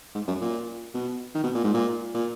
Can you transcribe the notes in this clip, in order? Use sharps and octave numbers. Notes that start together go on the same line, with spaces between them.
G#2
F#2
A#2
B2
D#3
B2
A#2
G#2
A#2
A#2